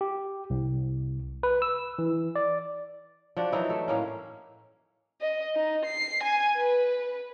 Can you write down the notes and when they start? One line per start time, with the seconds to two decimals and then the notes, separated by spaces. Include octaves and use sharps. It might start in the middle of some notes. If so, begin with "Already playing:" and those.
0.01 G4
0.50 C2
1.43 B4
1.62 E6
1.99 E3
2.36 D5
3.36 F3 D4 F#4
3.52 E3 F#3 D#4 E4
3.70 A3
3.88 A2 A#3 C#4
5.21 D#5
5.56 D#4
5.85 C7
6.23 G#5
6.57 B4